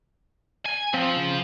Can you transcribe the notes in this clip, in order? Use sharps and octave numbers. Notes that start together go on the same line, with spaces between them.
G#5
F3 C4
C#3